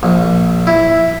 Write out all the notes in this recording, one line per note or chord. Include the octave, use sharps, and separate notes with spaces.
A#1
E4